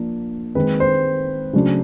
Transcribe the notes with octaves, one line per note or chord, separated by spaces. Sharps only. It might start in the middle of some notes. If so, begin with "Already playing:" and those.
Already playing: F3 A#3 D4
D#3 G#3 C4 B4
C5
C#3 F#3 A3 D4